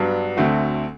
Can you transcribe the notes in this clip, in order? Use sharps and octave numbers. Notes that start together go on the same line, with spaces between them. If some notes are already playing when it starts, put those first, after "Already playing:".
Already playing: G2 F#3 B3 D4
D2 D3 A3 C4 F#4